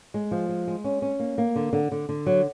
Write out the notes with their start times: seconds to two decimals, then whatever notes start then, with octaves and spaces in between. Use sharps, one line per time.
0.14 G#3
0.31 F3
0.49 G#3
0.67 G#3
0.84 C#4
1.02 C#4
1.20 A#3
1.38 A#3
1.56 D3
1.73 D3
1.92 D3
2.09 D3
2.26 F#3